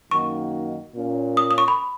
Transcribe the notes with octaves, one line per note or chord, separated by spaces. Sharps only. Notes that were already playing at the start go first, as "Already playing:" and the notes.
F#2 D#3 A#3 D#4 F#4 C#6
A#2 A#3 C#4
D#6
D#6
C#6
B5